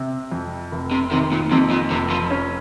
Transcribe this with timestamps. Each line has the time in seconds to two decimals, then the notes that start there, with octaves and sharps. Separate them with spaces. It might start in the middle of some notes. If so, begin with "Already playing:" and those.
Already playing: C3
0.32 F2
0.72 F1
0.91 C3
1.11 C3 D#3
1.32 A#2
1.51 F2 C3
1.71 A#2
1.91 F1 C3
2.10 F3
2.31 C#4